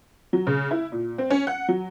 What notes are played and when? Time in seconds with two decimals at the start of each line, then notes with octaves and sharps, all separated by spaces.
0.33 F#3
0.47 C#3
0.71 E4
0.92 A#2
1.18 C4
1.30 C#4
1.47 F#5
1.68 F#3